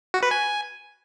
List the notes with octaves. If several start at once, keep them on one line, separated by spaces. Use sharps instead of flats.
F#4
B4
G#5